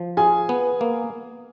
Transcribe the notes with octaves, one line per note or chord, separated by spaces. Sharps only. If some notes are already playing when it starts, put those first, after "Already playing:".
Already playing: F3
F4 G#4 G#5
B3
A#3